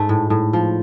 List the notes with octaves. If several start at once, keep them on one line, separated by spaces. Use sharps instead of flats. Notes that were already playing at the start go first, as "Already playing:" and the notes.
Already playing: G#2 A3
A2
A2
F3